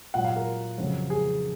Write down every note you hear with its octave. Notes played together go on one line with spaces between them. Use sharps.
A#2 F#3 F#5
F5
A#4
F2 C#3 F#3
G#4